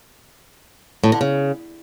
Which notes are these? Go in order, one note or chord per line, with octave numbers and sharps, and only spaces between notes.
A2
D3
C#3